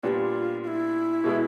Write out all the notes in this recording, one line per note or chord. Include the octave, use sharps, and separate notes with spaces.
A#2 G3 B3 D4 F4 F#4
F4
E4
B2 G#3 B3